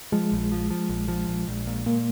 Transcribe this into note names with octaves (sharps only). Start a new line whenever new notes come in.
F3 G#3
A#1
F3
F3
A#1
F3
A#1
A#1
A#2
A#2 A#3